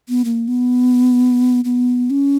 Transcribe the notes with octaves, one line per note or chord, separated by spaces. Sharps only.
B3
A#3
B3
B3
C#4